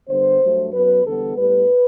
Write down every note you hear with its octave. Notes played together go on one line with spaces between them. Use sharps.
G2 D3 G3 B3 C5
G2 F#3 A3
F#2 F#3 B3 B4
E2 D3 G3 B3 A4
A2 G3 B3 B4